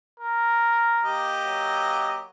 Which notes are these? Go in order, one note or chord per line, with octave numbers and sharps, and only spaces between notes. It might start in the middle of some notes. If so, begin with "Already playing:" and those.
A#4
A#3 G4 D#5
F#3